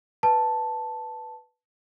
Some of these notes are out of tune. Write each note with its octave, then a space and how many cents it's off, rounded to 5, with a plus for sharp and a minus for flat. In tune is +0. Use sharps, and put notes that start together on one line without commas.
B4 +0 A5 +0